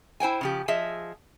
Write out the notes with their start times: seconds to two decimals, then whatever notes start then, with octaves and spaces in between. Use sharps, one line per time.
0.20 E4 C5 G5 G#5
0.41 C#3 F3 G4
0.68 F3 G#4 D#5 E5